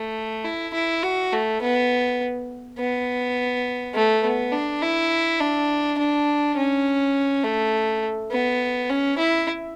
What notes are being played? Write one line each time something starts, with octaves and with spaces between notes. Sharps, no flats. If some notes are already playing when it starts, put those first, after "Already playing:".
Already playing: A3
E4
E4
F#4
A3
B3
B3
A3
B3
D4
E4
D4
D4
C#4
A3
B3
C#4
E4